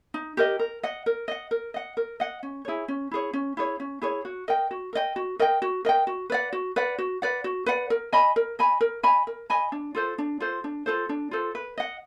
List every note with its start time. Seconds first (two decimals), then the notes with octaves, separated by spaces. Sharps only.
0.14 D#4
0.37 G4 A#4 D#5
0.59 A#4
0.83 D#5 F#5
1.06 A#4
1.28 D#5 F#5
1.51 A#4
1.74 D#5 F#5
1.97 A#4
2.20 D#5 F#5
2.43 C#4
2.65 E4 G#4 C#5
2.88 C#4
3.11 E4 G#4 C#5
3.33 C#4
3.57 E4 G#4 C#5
3.80 C#4
4.02 E4 G#4 C#5
4.25 F#4
4.48 A#4 D#5 G5
4.71 F#4
4.93 A#4 D#5 G5
5.16 F#4
5.39 A#4 D#5 G5
5.62 F#4
5.85 A#4 D#5 G5
6.07 F#4
6.30 B4 D5 F#5
6.53 F#4
6.76 B4 D5 F#5
6.98 F#4
7.22 B4 D5 F#5
7.44 F#4
7.66 B4 D5 F#5
7.90 A#4
8.13 D#5 G#5 B5
8.36 A#4
8.59 D#5 G#5 B5
8.81 A#4
9.03 D#5 G#5 B5
9.27 A#4
9.50 D#5 G#5 B5
9.72 D4
9.95 F4 A4 C5
10.18 D4
10.40 F4 A4 C5
10.64 D4
10.86 F4 A4 C5
11.09 D4
11.31 F4 A4 C5
11.55 B4
11.78 D#5 F#5